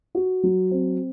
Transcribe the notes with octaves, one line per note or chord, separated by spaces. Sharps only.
F#4
F#3
C4